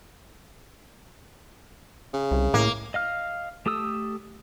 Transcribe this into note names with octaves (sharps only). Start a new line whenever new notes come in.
C#3
C2
A2 A#3
D#5 F5 F6
A3 G4 A4 D#6 E6